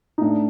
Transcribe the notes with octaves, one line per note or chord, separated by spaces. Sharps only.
D#4
A2 D4